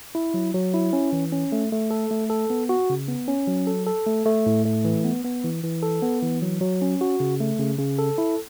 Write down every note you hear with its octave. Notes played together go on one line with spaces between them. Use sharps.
E4
F#3
F#3
E4
C#4
E3
C#4
A3
A3
A4
A3
A4
B3
F#4
C#3
B3
C#4
F#3
A4
A4
A3
A3
A2
A3
E3
B3
B3
E3
E3
A4
B3
E3
F#3
F#3
C#4
F#4
C#3
A3
C#3
C#3
A4
E4